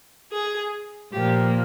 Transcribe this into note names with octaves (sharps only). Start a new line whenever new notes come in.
G#4
A#2 F3 A#3 G4